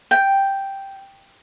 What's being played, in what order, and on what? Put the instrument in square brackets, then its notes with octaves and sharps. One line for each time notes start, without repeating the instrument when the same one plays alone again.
[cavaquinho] G5